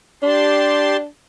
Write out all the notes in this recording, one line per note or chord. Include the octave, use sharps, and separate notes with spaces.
D4 G4 A5 C6